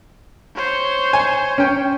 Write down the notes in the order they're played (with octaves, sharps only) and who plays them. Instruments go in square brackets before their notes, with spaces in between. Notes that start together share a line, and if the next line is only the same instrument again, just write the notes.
[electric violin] C5 C#5
[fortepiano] G#5
C#4 G5